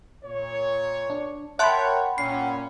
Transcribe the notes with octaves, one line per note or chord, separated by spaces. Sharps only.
A#2 C#5
D4
A#4 C#5 E5 F#5 G5 A5 B5 C6
A#2 C#4 C7